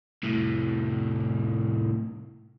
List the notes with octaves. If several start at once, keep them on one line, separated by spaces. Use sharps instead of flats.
C2 A2